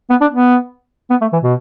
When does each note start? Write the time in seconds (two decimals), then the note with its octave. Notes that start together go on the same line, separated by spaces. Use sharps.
0.10 B3
0.21 D4
0.32 B3
1.10 B3
1.21 A3
1.33 E3
1.44 B2